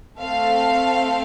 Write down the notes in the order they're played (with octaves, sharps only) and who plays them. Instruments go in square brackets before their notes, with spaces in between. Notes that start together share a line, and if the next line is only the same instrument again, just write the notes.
[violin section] A3 C4 A4 F5